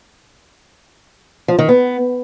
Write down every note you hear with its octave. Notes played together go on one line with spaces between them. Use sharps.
F3
D#3
B3